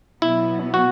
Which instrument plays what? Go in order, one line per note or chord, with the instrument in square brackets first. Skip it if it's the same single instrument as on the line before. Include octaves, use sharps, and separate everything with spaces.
[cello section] B2 F#3 B3 [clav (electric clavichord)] E4
[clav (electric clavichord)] F#4